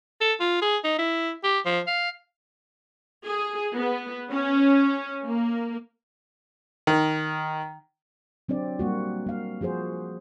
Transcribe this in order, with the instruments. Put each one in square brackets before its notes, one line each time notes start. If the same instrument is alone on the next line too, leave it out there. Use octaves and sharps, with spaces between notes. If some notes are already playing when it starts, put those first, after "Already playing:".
[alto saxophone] A4
F4
G#4
D#4
E4
G4
F3
F5
[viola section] G#4
B3
C#4
A#3
[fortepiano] D#3
[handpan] F#3 C4 D4 D5
G3 A#3 F#4
A#3 F5
F3 F#4 G#4 C5